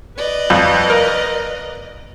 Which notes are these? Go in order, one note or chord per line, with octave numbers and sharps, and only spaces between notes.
B4 D5 D#5
F2
A#4